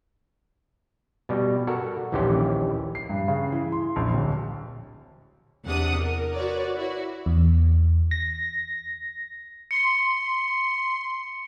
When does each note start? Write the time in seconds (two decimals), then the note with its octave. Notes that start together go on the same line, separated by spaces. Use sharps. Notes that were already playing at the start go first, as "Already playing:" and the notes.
1.29 B2 G3
1.67 F#4 A4 A#4
2.12 A#1 D#2 E3 C#4 G4 C5
2.95 C7
3.09 G2
3.28 C#3
3.52 E3
3.72 C6
3.96 A#1
4.13 D1
5.65 E2 C3 D4 F#5 D#6
5.97 A#4
6.34 F#4 B4 C#5 D5
6.75 E4 F#4
7.26 E2
8.11 A#6
9.71 C6 C#7